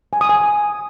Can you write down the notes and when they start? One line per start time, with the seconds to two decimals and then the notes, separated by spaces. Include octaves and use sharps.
0.13 G#5
0.21 D#6
0.29 G#5